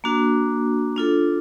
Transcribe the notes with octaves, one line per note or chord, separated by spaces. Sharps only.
A#3 D4 F#4
D4 F4 A4